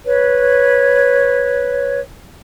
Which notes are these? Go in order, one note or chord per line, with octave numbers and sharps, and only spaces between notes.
B4 C#5